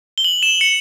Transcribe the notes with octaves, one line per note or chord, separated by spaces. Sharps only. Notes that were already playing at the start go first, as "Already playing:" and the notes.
G7
F#7
E7
C#7